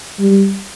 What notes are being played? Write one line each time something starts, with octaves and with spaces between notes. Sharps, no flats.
G3